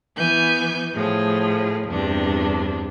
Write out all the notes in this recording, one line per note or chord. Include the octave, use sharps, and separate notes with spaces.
E3 B3 G#5 G6
A2 F3 G#4
E2 G2 C3 D4